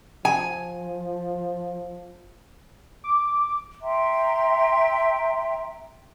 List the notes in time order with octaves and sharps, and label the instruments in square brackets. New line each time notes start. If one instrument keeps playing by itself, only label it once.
[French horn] F3 [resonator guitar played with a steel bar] G#5
[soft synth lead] D6
[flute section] E5 G5 A#5 C6